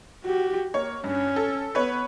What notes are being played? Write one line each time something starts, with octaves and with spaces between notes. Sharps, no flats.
F#4 G4
A#3 C#5
G2 C#4
A4
B3 B4 C#5